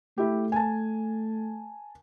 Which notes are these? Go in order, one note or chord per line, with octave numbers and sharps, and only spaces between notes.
A3 E4 G4
G#5 A5